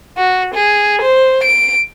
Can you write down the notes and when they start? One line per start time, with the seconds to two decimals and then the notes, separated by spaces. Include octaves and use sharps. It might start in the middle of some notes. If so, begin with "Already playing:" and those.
0.17 F#4
0.55 G#4
1.02 C5
1.44 D7